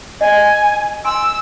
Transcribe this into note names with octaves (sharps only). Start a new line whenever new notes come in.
D#5 G#5
G#5 C6 E6